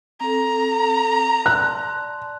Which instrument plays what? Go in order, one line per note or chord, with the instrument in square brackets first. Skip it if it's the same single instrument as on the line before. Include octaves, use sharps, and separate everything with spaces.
[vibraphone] C4 A4 [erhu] A#5
[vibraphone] D5 A5 C6 [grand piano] F#6